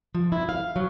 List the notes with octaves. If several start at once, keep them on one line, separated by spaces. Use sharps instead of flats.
F3
E4
F5
F#3